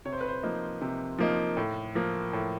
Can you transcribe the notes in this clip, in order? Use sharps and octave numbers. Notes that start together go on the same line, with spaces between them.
C3 C#5
C5
B4
C5
F3 A#3 D#4
C3
F3 A#3 D#4
A2
F3 A#3
A2